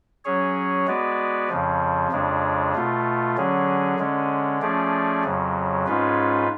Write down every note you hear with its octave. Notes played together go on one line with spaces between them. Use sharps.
F#3 C#4 G#4 C#5
G#3 B3 F#4 B4 D5
F2 C#3 F3
F2 C#3 G#3 D4
B2 A3 F4
D3 F#3 C#4 G#4
D3 G#3 C#4
F3 A3 C#4 G#4 D5
F2 C#3 F#3
G#2 G#3 C#4 F4 B4